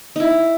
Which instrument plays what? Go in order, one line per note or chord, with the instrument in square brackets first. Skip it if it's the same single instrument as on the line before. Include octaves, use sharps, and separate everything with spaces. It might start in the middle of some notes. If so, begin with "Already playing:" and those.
[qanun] D#4 E4